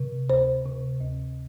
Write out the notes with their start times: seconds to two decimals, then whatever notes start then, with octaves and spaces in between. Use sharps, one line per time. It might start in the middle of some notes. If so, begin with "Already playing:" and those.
Already playing: C3
0.30 D2 C5
0.66 C3
1.01 D2